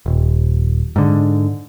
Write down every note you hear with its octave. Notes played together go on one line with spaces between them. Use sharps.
D#1
G#2 D3